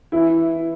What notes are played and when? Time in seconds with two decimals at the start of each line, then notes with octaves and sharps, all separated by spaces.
0.12 E3 E4